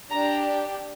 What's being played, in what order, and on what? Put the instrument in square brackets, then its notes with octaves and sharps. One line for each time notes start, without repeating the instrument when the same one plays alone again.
[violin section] D4 G4 A#5